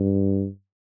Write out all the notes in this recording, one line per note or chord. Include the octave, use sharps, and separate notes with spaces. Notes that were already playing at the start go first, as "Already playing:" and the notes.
Already playing: G2